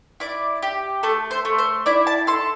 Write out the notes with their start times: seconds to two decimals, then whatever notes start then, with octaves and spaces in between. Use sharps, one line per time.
0.20 E4 D5
0.62 G4
1.03 A3 A4
1.31 C5
1.45 A3
1.58 C5
1.86 E4 D5
2.07 A5
2.27 A4 C6